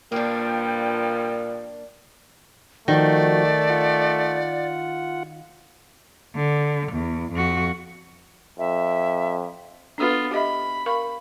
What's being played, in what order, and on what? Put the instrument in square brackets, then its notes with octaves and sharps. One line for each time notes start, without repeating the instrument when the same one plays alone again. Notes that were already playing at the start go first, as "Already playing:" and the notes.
[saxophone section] G2 F3 G3 [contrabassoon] A#2 [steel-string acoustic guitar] A#3 D4 [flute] G5
[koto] D#3 [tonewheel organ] F3 F#4 [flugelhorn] A3 [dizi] D5
[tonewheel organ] F4 F#5
[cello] D3
E2
F2 F#4
[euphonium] F2 [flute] E5
[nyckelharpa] B3 F4 [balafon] D4 A4
[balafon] G4 D#5 E5 [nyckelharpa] B5
[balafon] A#4 F5 C#6 [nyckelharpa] B5